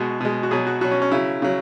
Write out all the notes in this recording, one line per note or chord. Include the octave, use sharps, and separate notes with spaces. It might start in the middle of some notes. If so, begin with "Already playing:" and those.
Already playing: B2 G#3 F#4
B2 G#3
F#4
B2 F#3 G#4
F#4
B2 F#3 F#4
C#4
C#4
C#3 F#3 E4
C#3 F#3